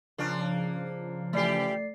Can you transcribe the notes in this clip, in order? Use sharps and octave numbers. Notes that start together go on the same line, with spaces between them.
C#3 F3 A#3 D4
E3 A3 G4 D5 C7